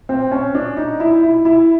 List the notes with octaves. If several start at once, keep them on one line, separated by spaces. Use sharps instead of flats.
C4
C#4
D4
D#4
E4
E4
E4